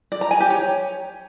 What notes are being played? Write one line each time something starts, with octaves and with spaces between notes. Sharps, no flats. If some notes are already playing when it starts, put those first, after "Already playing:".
D5
A#5
G#5
G4
C#5